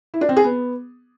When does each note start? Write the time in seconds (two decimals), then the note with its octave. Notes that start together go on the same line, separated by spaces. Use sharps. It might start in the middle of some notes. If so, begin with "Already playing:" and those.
0.14 E4
0.21 D4
0.29 C4
0.37 G#4
0.44 B3